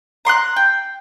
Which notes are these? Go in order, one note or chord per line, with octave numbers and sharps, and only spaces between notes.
A#5 C6 D6 F#6
G5